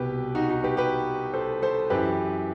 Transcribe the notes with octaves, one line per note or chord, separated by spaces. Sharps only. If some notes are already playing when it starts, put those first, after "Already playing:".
Already playing: C2 B2 G4 B4
D#4 F#4
D#4 F#4
G4 B4
G4 B4
A4 C5
A4 C5
F#2 E3 G4 B4